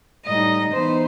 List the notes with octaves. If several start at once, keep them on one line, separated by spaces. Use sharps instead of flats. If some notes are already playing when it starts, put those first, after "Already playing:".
A2 G3 D#4 D#5
E3 B3 D#4 C5